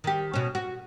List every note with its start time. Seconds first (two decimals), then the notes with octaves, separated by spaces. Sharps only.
0.04 D#3 G4
0.33 B2 C#4
0.55 F#4